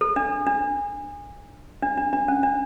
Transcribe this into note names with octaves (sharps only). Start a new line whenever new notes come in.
A4
D4
D4
D4
D4
D4
C#4
D4